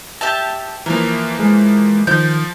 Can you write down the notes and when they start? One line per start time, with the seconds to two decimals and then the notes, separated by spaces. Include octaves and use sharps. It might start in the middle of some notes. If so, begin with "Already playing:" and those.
0.21 G4 E5 A5
0.86 E3 F3 A#3 A#4
1.39 G#3
2.07 D#3 F3 G6